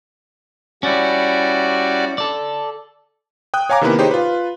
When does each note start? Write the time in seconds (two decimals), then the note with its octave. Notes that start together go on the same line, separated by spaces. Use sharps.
0.83 G3 C#4 E4 F#4 D5
2.18 A4 D5
3.54 G5 D#6 F#6
3.69 C#5 F5 G#5 A#5 D6
3.81 C3 D#3 A#3 B3 E4 B4
3.98 D#4 G4 G#4 C5 C#5 D#5
4.11 F4 B4